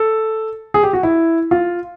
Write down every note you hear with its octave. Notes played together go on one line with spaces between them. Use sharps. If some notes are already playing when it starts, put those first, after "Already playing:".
Already playing: A4
G#4
G4
F#4
E4
F4